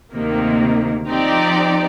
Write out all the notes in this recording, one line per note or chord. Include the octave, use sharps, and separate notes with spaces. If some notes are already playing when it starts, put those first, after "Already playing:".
D2 C3 D#3 A#3
F3 C4 D#4 G4 D5